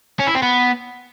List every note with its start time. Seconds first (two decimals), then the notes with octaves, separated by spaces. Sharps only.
0.19 C#4
0.27 E4
0.35 C4
0.42 B3